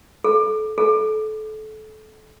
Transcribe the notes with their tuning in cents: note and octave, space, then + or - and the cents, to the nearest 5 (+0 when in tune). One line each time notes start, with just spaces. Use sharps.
A4 -25
A4 -25